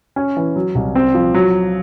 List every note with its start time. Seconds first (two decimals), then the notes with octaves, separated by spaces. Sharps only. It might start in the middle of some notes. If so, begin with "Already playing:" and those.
0.16 C#4
0.37 E3
0.56 F#3
0.75 C2
0.96 C4
1.14 F3
1.34 F#3